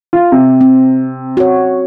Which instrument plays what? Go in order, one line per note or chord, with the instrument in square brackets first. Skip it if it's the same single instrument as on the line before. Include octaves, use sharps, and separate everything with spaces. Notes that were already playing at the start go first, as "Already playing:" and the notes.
[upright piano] F4
C3
[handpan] C4
F#4 C#5